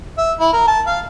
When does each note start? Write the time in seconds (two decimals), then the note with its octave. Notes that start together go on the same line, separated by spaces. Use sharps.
0.18 E5
0.40 E4
0.53 A#4
0.68 A5
0.87 F5